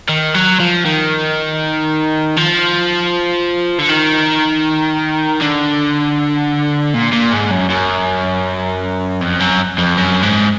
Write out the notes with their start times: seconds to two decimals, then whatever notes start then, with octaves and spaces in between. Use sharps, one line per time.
0.09 D#3
0.34 F#3
0.60 F3
0.85 D#3
2.37 F3
3.79 D3
3.89 D#3
5.41 D3
6.94 A#2
7.12 A#2
7.31 G#2
7.51 F#2
7.69 F#2
9.21 F2
9.40 F#2
9.78 F2
9.97 F#2
10.23 G#2